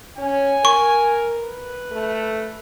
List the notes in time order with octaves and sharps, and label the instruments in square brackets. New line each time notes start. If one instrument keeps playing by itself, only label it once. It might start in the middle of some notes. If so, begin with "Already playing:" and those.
[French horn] C#4 [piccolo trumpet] G#5
[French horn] A#4 [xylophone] C#6
[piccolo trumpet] B4
[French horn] A3